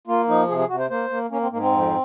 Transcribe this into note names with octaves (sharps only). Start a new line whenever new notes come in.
A#3 F4
F3 D#4
C3 G#4
G#4
C3 F#4
C5
A#3 C5
A#3
A#3 C#4
C4
G#2 A#3
C4
F2